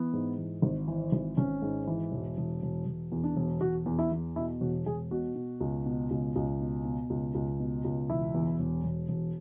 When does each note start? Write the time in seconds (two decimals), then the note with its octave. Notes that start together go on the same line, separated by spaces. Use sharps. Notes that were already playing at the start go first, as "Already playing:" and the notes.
Already playing: E3 B3
0.13 G#2
0.38 E3
0.62 G#1
0.88 E3
1.12 G#1
1.37 G#1 C#4
1.62 G#2
1.87 E3
2.12 E1
2.37 E1
2.62 E1
2.86 E1
3.12 E2
3.24 D4
3.36 E1
3.61 E1 F#4
3.86 E2
3.99 E4
4.12 E2
4.36 B2 E4
4.61 E1 F#4
4.86 E1 G#4
5.11 B2 F#4
5.35 B2
5.60 C#2
5.86 B2
6.10 C#2
6.35 C#2
6.61 B2
6.85 B2
7.10 C#2
7.34 C#2
7.60 B2
7.84 C#2
8.10 E1 E4
8.34 E2
8.59 E1
8.84 E1
9.09 E1